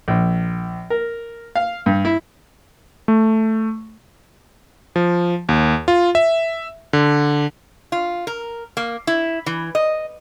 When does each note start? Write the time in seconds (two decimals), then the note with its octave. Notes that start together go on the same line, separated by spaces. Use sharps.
0.08 A#1
0.90 A#4
1.56 F5
1.86 G2
2.05 E4
3.08 A3
4.96 F3
5.49 D#2
5.88 F4
6.15 E5
6.93 D3
7.92 F4
8.27 A#4
8.77 A#3
9.07 E4
9.46 E3
9.75 D#5